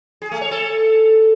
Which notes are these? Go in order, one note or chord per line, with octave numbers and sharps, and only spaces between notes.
G#4
A3
C#5
A4